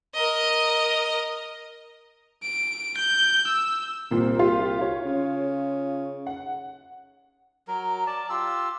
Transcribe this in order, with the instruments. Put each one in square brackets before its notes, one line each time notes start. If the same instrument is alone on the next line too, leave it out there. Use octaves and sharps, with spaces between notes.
[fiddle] A#4 D#5
[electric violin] D7
G6
E6
[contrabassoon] C2 [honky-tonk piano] A#2 C4
[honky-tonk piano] F4 G4 C6
F4 C#5
[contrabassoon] C#3
[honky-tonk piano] F#5
[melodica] F#3 A#4
D5 A5
F4 G4 E6